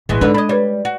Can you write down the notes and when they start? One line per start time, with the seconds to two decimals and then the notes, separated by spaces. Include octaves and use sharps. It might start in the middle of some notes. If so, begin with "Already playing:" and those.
0.09 A1 B2 E3 G#3
0.21 G#2 D3 G#3 D4 A4 B4 D5
0.34 D4 D#5 B5 G#6
0.49 G3 B4 C#5 D5
0.85 F#4